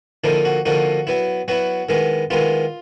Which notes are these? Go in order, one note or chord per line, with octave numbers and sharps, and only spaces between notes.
D3 F3 A#3 D#4 E4
F#4
D3 F3 A#3 D#4 F#4
F#3 B3 E4
F#3 B3 E4 F#4
D#3 G#3 B3 E4
D#3 G#3 B3 E4 F4